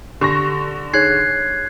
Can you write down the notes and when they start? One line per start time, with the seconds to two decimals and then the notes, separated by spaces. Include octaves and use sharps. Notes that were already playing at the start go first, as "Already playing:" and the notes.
0.21 D3 G4 C#6 A#6
0.93 D#4 G#4 C#5 F#6 G#6 C7